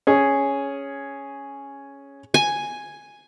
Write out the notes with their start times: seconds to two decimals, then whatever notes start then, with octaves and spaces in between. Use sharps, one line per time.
0.07 C#4 G#4
2.34 G#5